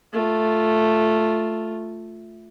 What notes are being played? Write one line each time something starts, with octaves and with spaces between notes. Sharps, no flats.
A3 F4